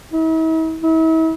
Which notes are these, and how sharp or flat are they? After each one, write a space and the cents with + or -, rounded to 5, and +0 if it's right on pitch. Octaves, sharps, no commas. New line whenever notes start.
E4 -45
E4 -40